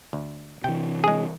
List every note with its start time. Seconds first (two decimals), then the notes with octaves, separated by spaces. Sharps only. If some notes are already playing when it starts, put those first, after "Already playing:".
0.13 D2
0.64 C3 E3 G5
1.04 G#3 G#4